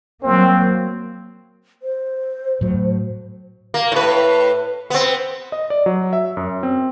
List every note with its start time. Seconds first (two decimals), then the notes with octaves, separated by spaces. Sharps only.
0.22 F#3 A#3 C4
1.83 C5
2.61 A2 F#3
3.74 A#3
3.92 A2 B4
4.90 B3 C4
5.52 D#5
5.70 D5
5.86 F#3
6.13 E5
6.37 F#2
6.63 C4